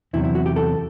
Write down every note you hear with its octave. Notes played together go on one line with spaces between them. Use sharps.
E2 C3 F#3 E4
E4
F#4
G4
A4